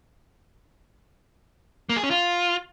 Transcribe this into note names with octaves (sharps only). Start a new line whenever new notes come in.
A#3
G#4
C#4
F4